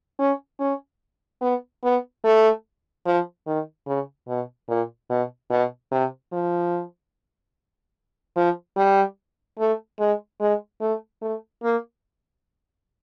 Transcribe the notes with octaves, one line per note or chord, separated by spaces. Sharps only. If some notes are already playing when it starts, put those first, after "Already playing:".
C#4
C#4
B3
B3
A3
F3
D#3
C#3
B2
A#2
B2
B2
C3
F3
F3
G3
A3
G#3
G#3
A3
A3
A#3